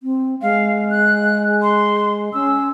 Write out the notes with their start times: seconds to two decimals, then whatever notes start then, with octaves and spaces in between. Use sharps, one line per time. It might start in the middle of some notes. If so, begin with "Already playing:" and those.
0.03 C4
0.42 G#3 F5
0.91 F#6
1.62 C6
2.33 C#4 E6